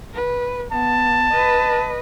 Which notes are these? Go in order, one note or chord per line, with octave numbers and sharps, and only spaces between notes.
B4
B3 A5
B4 D#5